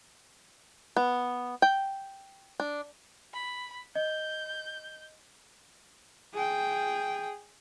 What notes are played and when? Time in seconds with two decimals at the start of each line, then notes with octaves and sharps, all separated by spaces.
0.96 B3
1.62 G5
2.60 D4
3.34 B5
3.96 D#5 G6
6.34 G#4 G5